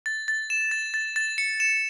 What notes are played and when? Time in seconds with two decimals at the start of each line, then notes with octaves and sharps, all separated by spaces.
0.06 A6
0.28 A6
0.50 E7
0.71 A6
0.94 A6
1.16 A6
1.38 C#7
1.60 E7